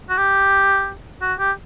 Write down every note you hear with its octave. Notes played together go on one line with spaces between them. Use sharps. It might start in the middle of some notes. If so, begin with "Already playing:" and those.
F#4
G4
F#4
G4